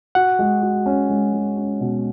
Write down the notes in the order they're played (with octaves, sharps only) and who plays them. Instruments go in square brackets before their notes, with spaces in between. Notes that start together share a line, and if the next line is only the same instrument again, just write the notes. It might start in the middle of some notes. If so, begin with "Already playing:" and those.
[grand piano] F#4 [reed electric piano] F#5
[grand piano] G#3
F#4
C#4
G#3
G#3
C#4
B2